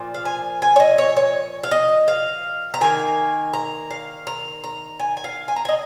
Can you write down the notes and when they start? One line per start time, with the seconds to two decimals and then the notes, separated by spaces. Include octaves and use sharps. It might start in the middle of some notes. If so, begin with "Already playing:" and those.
Already playing: A#2 F3
0.14 F5
0.25 G#5
0.62 G#5
0.76 C#5
0.80 D#5
0.98 C#5
1.17 C#5
1.63 F5
1.71 D#5
2.08 F5
2.74 A#5
2.81 D#3 A#3 G#5
3.53 A#5
3.91 F5
4.27 A#5
4.64 A#5
4.99 G#5
5.17 G#5
5.24 F5
5.48 G#5
5.56 A#5
5.65 D#5 G#5